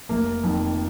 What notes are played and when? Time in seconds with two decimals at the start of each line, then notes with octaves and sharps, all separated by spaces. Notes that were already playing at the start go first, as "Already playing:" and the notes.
0.09 F1 A#3
0.43 F2 D#3